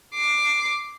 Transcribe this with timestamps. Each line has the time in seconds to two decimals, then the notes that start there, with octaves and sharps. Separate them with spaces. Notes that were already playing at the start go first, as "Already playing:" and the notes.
0.14 D6 C7